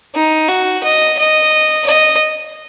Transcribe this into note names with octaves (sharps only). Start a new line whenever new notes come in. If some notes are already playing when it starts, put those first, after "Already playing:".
D#4
F#4
D#5
D#5
D#5